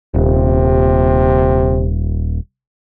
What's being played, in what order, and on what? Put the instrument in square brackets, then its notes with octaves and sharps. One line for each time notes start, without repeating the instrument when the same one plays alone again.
[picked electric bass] D#1 [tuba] C3